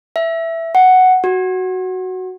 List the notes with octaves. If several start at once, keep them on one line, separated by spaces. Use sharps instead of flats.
E5
F#5
F#4